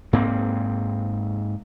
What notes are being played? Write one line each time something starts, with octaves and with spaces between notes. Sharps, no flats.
G#2 A#3 C4